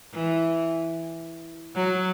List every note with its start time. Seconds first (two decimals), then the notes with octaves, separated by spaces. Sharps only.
0.12 E3
1.75 F#3